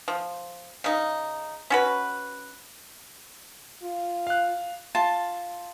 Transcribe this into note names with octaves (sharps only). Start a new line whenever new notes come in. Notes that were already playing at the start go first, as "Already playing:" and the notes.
F3
C#3 D#4
C#4 F#4 B4
F4
F5 F#6
F4 A5